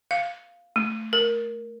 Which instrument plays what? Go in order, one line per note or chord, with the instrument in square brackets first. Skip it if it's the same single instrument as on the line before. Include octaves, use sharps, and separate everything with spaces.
[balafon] F5
A3
A#4